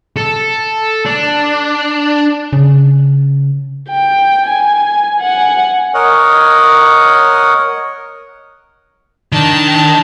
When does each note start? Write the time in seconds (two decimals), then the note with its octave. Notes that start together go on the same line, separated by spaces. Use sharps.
0.16 A4
1.05 D4
2.53 C#3
3.90 G5
4.46 G#5
5.20 F#5 G#5
5.94 A#4 C#5 D#5 F#5
9.32 D#3 D4 A5